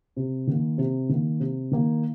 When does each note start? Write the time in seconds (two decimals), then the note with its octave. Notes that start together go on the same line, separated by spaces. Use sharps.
0.16 C3
0.47 D#3 A#3
0.78 C3
1.09 D#3 A#3
1.40 C3
1.71 D#3 A#3